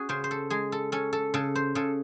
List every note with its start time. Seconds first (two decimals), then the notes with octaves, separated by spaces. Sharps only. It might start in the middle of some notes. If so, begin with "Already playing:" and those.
Already playing: C#4 F#4 G#4
0.09 C#3 C5
0.24 C5
0.31 A4
0.50 G#3 G#4
0.72 A4
0.92 C#4 A4
1.13 A4
1.34 C#3 A4
1.55 C5
1.75 C#3 A4